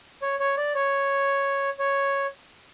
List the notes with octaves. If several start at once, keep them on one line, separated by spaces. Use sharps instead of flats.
C#5
C#5
D5
C#5
C#5